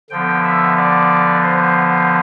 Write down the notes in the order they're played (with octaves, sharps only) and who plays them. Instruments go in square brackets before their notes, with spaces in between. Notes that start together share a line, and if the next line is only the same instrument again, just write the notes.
[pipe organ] D3 F3 B3 G5
E5
D5
C5